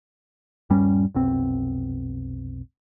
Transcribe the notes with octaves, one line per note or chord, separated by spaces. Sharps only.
D#1 G2 G3 C#4
F1 B1 C4